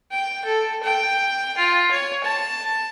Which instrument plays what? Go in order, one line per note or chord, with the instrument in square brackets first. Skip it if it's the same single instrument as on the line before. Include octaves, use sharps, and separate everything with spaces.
[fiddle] G5
A4
G5
F4
C#5
A5